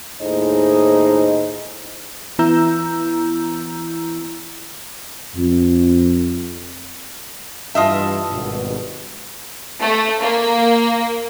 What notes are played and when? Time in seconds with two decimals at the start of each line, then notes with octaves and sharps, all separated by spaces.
0.21 D#2 A2 D#4 G#4 C5 D#5
2.39 E3 B3 E4 A#5 E6 G6
5.35 F2
7.75 G2 E3 F4 D#5 E5 A5
8.30 G#1 G2 B2
9.81 A3
10.21 A#3